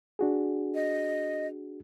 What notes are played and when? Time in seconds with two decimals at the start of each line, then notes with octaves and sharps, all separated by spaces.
0.19 D4 F#4 G#4
0.75 D#5